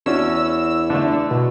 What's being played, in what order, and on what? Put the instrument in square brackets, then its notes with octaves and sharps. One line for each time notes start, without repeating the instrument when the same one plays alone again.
[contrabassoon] E2 [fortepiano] C#4 D4 F#4 [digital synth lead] E6
[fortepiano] D3 A3 [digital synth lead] D4
[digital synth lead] B2